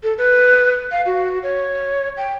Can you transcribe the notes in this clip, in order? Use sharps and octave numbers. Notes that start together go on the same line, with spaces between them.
A4
B4
F5
F#4
C#5
G5